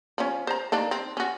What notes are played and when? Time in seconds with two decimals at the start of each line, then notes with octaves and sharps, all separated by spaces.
0.18 F3 C#4
0.47 C5 A#5
0.72 D#3 A#3 D4
0.91 C4
1.17 C#4 F#4